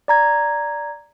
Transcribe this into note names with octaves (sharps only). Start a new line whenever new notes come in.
D5 A#5 G#6